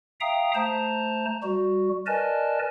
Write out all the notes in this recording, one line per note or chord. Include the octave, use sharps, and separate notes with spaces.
E5 F5 G5 A#5 D#6
A3 C5 A5 A#5
G3 F#4
A#4 B4 D5 D#5 G#5 A5